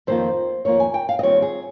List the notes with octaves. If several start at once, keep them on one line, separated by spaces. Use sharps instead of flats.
F2 D#3 A#3 F4 C5
F2 D#3 A#3 F4 C#5
G#5
G5
F5
D#5
D#2 D#3 G3 C4 F4 C#5
G#4